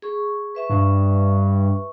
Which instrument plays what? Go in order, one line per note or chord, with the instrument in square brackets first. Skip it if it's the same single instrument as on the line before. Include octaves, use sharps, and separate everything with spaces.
[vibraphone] G#4 C#6
B4 E5 C#6
[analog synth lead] G2